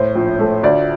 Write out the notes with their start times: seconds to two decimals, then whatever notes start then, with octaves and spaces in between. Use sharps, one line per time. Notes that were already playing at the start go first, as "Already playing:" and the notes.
Already playing: A2 C5
0.15 A#1
0.39 A3
0.63 D2 D5